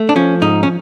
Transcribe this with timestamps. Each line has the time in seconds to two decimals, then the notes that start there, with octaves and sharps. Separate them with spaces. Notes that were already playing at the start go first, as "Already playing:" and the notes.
Already playing: A3
0.09 D4
0.16 F3 C#4
0.41 G#2 D#4
0.63 C#4